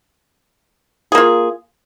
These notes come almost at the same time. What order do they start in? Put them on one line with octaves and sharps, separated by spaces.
G#4 A#3 F4